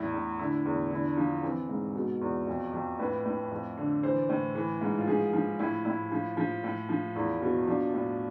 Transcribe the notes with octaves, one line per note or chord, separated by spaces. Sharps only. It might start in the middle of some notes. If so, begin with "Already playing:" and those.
Already playing: E2 A2 E4
A2
D3 E4
E2
D3 E4
F3
E3 C4
G#2
B2
E2
F2
F2
A2 B4
A2
F2
D3
E3 C5
A2
E3
G#2
F4
F3 G#4
F3
A2 E4
A2 E4
F3
F3
A2
F3
E2 E4
B2
F3 D4
A2